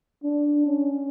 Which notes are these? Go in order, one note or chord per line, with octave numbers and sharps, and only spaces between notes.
D4
C#4